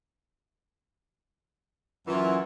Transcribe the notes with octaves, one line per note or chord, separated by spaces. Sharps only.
F#2 E3 F4